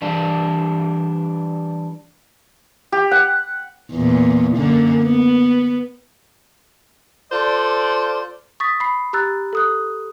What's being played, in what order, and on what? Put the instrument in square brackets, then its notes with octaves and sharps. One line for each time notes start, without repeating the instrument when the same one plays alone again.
[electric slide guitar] E3 G3 D4
[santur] G4
F#5
[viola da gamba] E2 A#2
F#2 D3 A#3
B3
[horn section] F4 A4 C5 D5
[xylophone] C#6 D#6 A6 B6
B5 C7
G4 A#5 E6 F#6 A6
A4 D#6 F#6